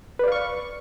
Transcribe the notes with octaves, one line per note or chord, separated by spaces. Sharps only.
B4 D5 F5 C#6